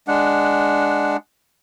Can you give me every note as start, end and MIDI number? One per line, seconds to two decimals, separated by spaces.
0.08 1.17 56
0.08 1.17 62
0.08 1.17 78